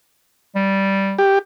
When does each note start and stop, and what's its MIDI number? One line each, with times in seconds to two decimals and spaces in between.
0.55 1.17 55
1.18 1.39 67